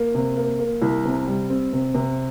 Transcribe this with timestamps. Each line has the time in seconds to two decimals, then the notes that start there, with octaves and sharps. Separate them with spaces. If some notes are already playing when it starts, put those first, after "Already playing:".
Already playing: A#3
0.15 C3
0.37 A#3
0.59 A#3
0.82 C2
1.05 C3
1.27 G3
1.50 C4
1.73 C3
1.94 C3